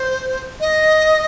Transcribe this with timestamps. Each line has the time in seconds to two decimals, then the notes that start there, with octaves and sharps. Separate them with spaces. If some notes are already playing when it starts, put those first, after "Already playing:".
Already playing: C5
0.60 D#5